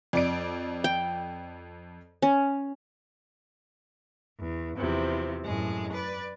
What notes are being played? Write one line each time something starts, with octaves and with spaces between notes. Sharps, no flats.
F2 D5 D7
G5
C#4
E2
E2 C3 F3
F#2 A2 G#3
B4 D5